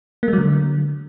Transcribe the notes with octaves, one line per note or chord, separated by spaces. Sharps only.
A#3
G#3
F#3
D3